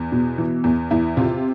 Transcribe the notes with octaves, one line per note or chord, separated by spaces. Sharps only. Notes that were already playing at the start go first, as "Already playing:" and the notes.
Already playing: E2
B2
E3
E2
E2 E4
C3 F4